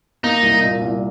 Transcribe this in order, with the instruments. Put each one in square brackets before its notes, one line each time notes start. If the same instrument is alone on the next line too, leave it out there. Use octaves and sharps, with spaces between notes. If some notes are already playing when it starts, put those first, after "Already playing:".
[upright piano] A#3 [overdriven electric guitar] D#4
[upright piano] C2
A#2
C2